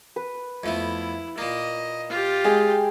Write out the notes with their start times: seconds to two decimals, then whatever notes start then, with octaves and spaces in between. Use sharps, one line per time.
0.16 B4
0.64 F2 A3 B3 E4
1.38 A#2 A#3 D#5
2.09 F4 G4
2.45 G#3 G#4 G5